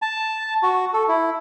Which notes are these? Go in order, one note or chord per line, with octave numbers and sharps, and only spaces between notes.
A5
F#4
A4
E4